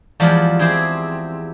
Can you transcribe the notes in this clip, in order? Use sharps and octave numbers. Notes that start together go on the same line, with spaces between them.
E2 F3 G3 G#3 G4 B5
C4 E4 G4 G#4 C5